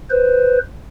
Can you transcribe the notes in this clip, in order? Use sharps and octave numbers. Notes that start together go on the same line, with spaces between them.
B4 C5